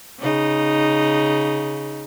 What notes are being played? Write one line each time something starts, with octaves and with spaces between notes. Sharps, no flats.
C#3 D#4